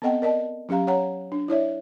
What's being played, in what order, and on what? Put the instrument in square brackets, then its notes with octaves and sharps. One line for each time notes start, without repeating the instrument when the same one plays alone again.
[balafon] B3 C4 A4 D#5 F#5 G5
A#4 D5 D#5 A5
F#3 C#4 G4 F5 A#5
C#5 F#5 A#5
D4
E4 C#5 D5 E5